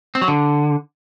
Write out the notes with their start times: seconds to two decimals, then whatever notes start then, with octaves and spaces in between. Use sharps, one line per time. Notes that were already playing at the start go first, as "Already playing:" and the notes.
0.15 C4
0.21 F#3
0.28 D3